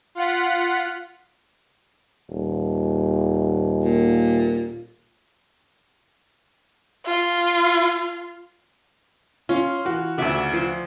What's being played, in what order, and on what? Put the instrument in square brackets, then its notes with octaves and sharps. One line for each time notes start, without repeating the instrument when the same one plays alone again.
[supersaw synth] F4 F#5 B6
[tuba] D#1
[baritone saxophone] A#2
[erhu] F4
[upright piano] C#4 [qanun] F4
[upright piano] E3 F#4
[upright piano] D2 C#3 F#4 [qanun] D5 E5
[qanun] F3